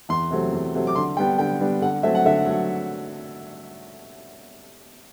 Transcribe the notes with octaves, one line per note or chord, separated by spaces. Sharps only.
E2 C6
C3 F#3 A3 C4
E2
C3 F#3 A3 C4
D6
D3 C6
G3 B3 D4 G5
D3 G5
G3 B3 D4
D3 F#5
F#3 A3 C4 E5
F#5
D3 E5
F#3 A3